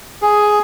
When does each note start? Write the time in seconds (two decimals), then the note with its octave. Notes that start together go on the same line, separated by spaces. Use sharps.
0.22 G#4